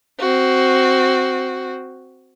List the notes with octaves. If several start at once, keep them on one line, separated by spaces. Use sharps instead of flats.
C4 F#4